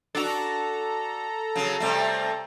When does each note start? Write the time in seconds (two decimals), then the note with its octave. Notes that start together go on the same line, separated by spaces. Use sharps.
0.15 D4 F#4 A4 A#5
1.55 C#3 F#3
1.80 C3 G3 A3